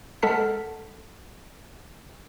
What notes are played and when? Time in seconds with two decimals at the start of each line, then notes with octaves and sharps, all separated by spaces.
0.22 G#3 A4 F#5 A5 F6 B6